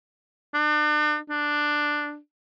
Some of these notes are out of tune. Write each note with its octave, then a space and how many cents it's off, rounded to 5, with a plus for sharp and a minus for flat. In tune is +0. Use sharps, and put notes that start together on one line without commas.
D4 +40
D4 +5